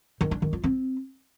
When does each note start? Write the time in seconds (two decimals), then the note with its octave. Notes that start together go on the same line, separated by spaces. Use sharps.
0.21 D#3
0.31 D4
0.42 D#3
0.53 F4
0.64 C4